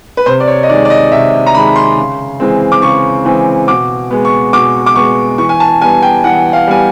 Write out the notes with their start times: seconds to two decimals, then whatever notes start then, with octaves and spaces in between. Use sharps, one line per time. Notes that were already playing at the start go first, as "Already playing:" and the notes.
0.17 B4
0.26 C3 C5
0.40 D5
0.48 C#5
0.63 D#5
0.69 D#3 D5
0.72 G#3
0.85 D5
0.90 D#5
1.12 C3 E5
1.47 A#5
1.54 D#3 B5
1.57 G#3
1.76 C6
1.97 C#3
2.40 E3 G#3 C4
2.72 D6
2.82 C#3 C#6
3.25 E3 G#3 C4
3.68 B2 D6
4.11 G#3 B3
4.25 C#6
4.53 B2 D6
4.86 D6
4.96 G#3 B3 C#6
5.38 E3 C#6
5.49 G#5
5.60 A5
5.81 G3 B3 G#5
6.02 G5
6.24 E3 F#5
6.53 F5
6.67 G3 B3 G#5